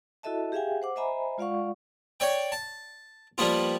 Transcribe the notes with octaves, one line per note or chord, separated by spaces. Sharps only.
E4 F#4 A4 D#5 E5 A5
G4 G#4 E5 F5 G5 G#5
C5 F#5 D6
C5 D#5 E5 G#5 A#5 B5
G#3 F4 D5 F5 F#5 C#6
C#5 D5 G5
A5
F3 G3 A#3 B3 F4